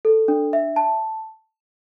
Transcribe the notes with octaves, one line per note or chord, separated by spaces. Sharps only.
A4
D4
E5
A5